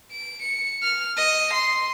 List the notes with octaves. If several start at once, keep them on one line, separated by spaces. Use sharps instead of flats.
D7
C#7
F6
D#5
C6